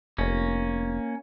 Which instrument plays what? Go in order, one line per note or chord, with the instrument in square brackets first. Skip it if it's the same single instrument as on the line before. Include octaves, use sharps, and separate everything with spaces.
[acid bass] F1 [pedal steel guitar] A#3 C#4